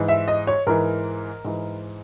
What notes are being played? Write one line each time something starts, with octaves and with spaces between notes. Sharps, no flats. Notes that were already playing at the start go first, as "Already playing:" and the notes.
Already playing: G#2 E3
E5
D#5
C#5
G#2 E3 A#4
G#2 E3